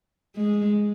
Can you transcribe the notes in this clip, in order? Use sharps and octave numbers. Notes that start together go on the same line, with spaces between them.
G#3